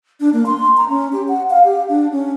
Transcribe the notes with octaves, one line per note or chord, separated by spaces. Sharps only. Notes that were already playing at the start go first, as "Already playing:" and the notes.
D4
A#3
C6
A#5
C#4
G4
F#5
F5
G4
D4
C#4